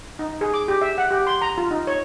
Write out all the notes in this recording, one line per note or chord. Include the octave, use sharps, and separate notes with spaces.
D#4
G#4
D6
G4
E5
F#5
G4
C6
A#5
F4
D#4
C#5